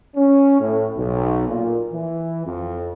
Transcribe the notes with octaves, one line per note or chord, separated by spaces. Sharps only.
C#4
A2
B1
A#2
E3
F2